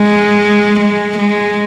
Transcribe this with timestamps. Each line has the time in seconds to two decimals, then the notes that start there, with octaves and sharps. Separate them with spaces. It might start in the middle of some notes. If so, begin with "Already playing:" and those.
Already playing: G#3
0.80 G#3
1.18 G#3